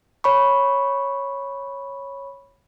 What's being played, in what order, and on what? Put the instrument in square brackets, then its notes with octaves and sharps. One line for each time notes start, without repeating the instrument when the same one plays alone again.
[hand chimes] C#5 B5 C#6